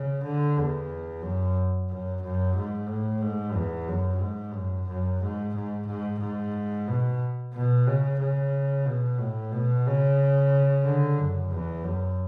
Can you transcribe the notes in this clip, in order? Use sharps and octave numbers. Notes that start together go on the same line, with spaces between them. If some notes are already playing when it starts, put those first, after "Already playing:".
Already playing: C#3
D3
E2
F#2
F#2
F#2
G#2
A2
G#2
E2
F#2
G#2
F#2
F#2
G#2
G#2
G#2
G#2
B2
B2
C#3
C#3
B2
A2
B2
C#3
D3
F#2
E2
F#2